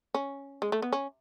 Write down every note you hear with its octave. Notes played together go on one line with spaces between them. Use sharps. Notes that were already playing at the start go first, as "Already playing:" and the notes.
C#4
G#3
A3
B3
C#4